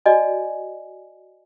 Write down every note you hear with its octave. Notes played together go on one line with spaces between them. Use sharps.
F#4 D5 D#5 G#5